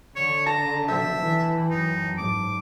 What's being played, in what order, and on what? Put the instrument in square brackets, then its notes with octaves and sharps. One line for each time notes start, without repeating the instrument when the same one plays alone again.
[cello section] D3 [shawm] C#5
[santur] A5 [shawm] A#5
[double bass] B2 F3 [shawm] E5 [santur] G5
[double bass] E3
[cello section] F#2 [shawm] D#4
[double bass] G#2 [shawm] D6